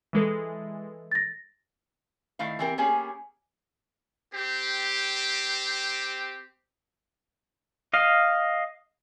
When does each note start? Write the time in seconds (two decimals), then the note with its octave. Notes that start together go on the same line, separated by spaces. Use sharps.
0.13 E3 G#3 A4
1.12 A6 A#6
2.39 D#3 A3 E4 F5
2.59 E3 B3 C4 G4 A#4
2.78 A#3 B3 C#4 G4 G#4
4.34 C4 G4
7.93 D#5 F5